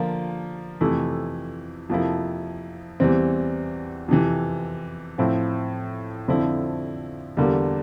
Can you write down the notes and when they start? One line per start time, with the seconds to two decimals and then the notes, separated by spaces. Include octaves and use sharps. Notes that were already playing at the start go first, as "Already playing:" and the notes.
Already playing: D3 F3 A#3 F4
0.81 F2 C3 E3 A3 E4
1.90 F2 C3 F3 A#3 E4
3.00 E2 E3 G3 C4
4.08 F2 C3 E3
5.18 A2 F3 C4 E4
6.28 F2 D3 F3 C4 E4
7.37 E2 D3 G3 A#3